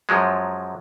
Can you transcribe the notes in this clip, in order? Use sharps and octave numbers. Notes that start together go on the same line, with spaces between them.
F#2 F3 F#3 G#3